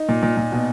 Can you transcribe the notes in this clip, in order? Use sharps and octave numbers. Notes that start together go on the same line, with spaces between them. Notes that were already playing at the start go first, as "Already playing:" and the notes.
Already playing: D#4
A#2
A#2
A#2
B2